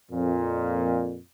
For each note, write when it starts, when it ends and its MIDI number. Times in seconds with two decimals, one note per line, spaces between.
0.12 1.18 41
0.12 1.18 46